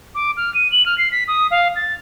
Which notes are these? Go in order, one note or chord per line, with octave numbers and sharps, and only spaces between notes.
D6
F6
D#7
F#7
F6
C7
B6
D#6
F5
A6